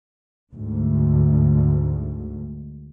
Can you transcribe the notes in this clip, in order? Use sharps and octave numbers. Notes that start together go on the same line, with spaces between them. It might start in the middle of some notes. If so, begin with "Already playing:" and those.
D2 G#2